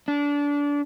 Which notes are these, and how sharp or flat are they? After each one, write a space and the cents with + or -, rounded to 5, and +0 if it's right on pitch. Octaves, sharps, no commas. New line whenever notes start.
D4 -25